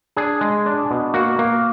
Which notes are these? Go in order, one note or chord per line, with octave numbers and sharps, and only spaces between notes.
D4 G#4
G#3
D4
B2
A#3 F#4
A#3